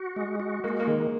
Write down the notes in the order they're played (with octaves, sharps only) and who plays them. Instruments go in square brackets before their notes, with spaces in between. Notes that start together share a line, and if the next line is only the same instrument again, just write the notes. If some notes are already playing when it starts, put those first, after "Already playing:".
Already playing: [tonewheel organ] F#4
G#3
F#4
[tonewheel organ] G#3 [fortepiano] A#3
[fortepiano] A#3
[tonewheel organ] D#3 [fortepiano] G#3